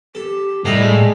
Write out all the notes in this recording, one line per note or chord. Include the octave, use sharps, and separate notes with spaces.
G4 A4
A2 G3 A#4 D#5
G#3